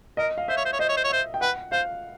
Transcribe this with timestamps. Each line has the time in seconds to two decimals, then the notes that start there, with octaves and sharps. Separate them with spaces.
0.17 A#4 D#5
0.38 F5
0.48 C5 E5
0.57 C#5
0.65 C5
0.72 C#5
0.79 C5 D#5
0.89 C#5
0.97 C5
1.04 C#5
1.10 C5 E5
1.34 G5
1.41 B4 F#5
1.72 C5 F5